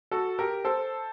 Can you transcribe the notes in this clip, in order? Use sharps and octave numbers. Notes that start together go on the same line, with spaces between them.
F#4 A4
G4 A#4
A4 C5